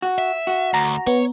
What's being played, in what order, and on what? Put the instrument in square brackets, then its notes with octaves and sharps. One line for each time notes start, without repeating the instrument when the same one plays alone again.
[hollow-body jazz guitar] F#4
[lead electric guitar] E5
[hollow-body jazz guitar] F#4
[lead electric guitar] D2 [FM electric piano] A#5
[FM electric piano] B3 [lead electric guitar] C#5